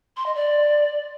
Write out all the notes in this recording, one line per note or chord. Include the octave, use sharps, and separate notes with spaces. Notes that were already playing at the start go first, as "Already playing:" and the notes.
C6
D#5
D5